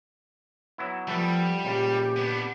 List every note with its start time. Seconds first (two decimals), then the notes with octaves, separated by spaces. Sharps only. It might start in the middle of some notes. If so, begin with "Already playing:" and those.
0.78 F#3 B3 E4
1.08 F3 G3 A3 B3
1.65 C#2 A#2 G4 F5
2.16 B3 D4